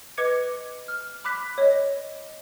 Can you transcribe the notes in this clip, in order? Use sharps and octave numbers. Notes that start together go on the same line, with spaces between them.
B4 D#5 D6 G#6 C#7
F6
B5 D6 F#6 B6
C#5 D#5